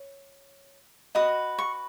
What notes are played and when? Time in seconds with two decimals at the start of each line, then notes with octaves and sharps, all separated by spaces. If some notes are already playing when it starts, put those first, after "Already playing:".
Already playing: C#5
1.15 F#4 B4 D#5 D#6
1.59 C#6